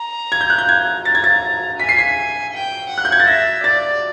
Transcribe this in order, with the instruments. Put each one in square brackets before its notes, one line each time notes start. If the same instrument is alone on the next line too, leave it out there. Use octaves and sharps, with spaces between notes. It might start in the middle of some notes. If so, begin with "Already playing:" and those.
Already playing: [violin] A#5
[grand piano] G#6
G6
F#6
G6
G#6
[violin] A#5 [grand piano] A6
[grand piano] G#6
A6
[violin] G#5 [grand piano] B6
[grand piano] C7
B6
[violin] G5
F#5
[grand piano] F#6
G6
G#6
A6
[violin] E5 [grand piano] A#6
[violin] D5 [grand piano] A6